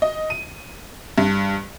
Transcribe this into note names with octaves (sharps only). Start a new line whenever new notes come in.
D#5
D#7
G2